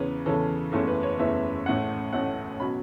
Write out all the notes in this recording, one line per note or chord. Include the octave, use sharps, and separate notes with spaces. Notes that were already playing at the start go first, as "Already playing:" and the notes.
Already playing: E2 C#3 E3 C#4 B4
E2 C#3 E3 C#4 A4
F#1 E2 E3 A3 C#4 A4
B4
C#5
F#1 E2 E3 A3 C#4 E5
A1 A2 A3 F#5
A1 A2 A3 F#5
B2 F#3 C#4 B5